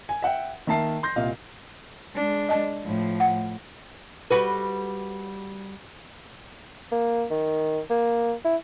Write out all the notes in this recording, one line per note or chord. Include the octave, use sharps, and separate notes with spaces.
G#5
E5 F#5 G5
D#3 A#3 E5 A5 C7
C6 G6 A#6
C2 A#2 D#5 F5
G#3 D4
D#5 A5
A2 F3
F#5
G3 F#4 B4
A#3
D#3
A#3
E4